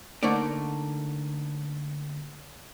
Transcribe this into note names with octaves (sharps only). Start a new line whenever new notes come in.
D3 A3 A#3 D#4 D5